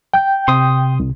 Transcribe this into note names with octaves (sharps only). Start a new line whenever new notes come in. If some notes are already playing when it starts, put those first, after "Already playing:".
G5 G6
C3 C6 D#6
C2